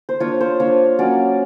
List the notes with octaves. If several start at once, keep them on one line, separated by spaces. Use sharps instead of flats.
C5
A#3 D4 F4 C#5
C5
A#3 D4 F4 C#5
F#3 A#3 C#4 D5